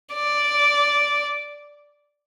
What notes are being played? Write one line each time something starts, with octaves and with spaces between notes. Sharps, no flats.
D5